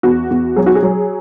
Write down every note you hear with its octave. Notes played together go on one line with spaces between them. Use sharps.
E2 F#4
E2
F#3 G#4
F#4
G#4
F#3